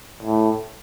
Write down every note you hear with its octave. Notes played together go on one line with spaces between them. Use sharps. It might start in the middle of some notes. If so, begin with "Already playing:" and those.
A2